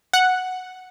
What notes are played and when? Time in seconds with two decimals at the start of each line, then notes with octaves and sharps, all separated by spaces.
0.13 F#5